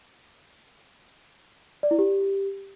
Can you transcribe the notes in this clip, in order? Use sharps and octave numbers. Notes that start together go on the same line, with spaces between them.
D5
E4
G4